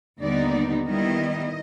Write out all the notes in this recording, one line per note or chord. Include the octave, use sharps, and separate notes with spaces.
D#2 D3 G3 B3 D#4 D5
D#3 G3 B3 E4 D#5